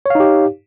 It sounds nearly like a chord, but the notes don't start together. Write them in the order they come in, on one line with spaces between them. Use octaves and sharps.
C#5 F5 D#4 G4